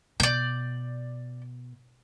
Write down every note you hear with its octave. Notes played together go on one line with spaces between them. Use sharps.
B2 D5 G6